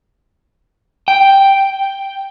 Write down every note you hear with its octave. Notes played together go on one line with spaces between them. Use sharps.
G5